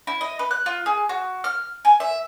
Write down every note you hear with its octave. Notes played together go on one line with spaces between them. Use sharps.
E4
D#5
B4
F#6
F4
G#4
F#4
F6
G#5
E5